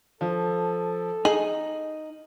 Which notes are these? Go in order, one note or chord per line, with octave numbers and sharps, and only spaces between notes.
F3 A4
D#4 G#4 F#7